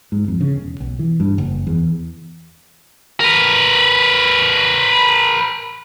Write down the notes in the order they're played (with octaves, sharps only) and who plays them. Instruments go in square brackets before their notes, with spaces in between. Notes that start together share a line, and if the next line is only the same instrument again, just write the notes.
[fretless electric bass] G#2
F2
C#3
E1
B1
E3
G2
F#1
E2
[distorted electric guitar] A#4 B4